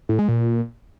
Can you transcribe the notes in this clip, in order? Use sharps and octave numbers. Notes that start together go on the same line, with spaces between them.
A2
G#3
A#2